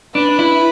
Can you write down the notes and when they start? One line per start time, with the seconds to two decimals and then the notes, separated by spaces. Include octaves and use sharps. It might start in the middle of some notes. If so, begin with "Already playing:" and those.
0.15 D4 B4
0.39 E4